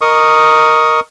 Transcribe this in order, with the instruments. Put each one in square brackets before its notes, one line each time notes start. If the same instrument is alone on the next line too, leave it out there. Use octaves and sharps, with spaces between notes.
[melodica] A#4 D#5 C#6 D#6